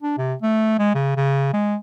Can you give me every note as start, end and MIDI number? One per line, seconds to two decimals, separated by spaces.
0.03 0.14 62
0.18 0.34 48
0.42 0.74 57
0.79 0.91 56
0.94 1.16 49
1.16 1.53 49
1.53 1.76 56